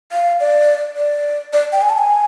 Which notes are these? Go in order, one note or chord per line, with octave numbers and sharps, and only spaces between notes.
F5
D5
D5
D5
G5
G#5
A5
G#5